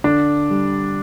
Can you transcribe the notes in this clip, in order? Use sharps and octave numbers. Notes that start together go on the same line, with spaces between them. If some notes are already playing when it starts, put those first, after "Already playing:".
D3 D4
G3